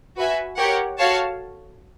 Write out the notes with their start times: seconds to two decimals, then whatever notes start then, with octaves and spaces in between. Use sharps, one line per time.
0.17 F#4 B4 E5 G#5
0.57 G4 A#4 C#5 F#5
0.98 F#4 A4 C#5 F5 A5